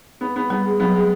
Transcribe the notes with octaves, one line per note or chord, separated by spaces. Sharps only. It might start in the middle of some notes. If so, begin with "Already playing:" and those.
B3
B3
G3 B3
G#3
F#3 B3
G#3